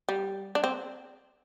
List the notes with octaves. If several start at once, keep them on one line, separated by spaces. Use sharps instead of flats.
G3
D4
C4